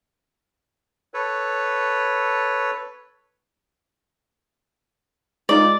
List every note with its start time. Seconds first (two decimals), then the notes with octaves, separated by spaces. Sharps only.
1.14 A4 B4 C#5
5.49 G#3 D#4 F4 D5